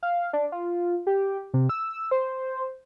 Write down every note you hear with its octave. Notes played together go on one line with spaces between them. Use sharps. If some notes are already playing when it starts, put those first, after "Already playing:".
F5
D4
F4
G4
C3
E6
C5